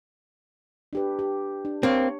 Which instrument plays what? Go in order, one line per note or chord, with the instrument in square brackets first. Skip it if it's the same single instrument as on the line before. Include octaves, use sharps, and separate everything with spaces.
[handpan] D4 G4 B4
G4
D4
[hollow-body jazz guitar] A#3 C4 [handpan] C#5